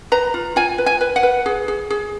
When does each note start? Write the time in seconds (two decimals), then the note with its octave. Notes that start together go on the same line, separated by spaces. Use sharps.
0.12 B4 A#5
0.34 F4
0.56 F4 G#5
0.78 B4
0.86 G#5
1.01 B4
1.16 F#5
1.23 B4
1.46 G#4
1.68 G#4
1.90 G#4